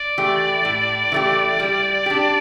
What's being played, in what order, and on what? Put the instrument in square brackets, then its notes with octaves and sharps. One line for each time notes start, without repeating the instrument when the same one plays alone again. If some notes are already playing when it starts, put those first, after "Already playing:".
Already playing: [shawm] D5
[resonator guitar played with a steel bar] E3 A3 G4
A2
E3 A3 G4
G3
D4 G4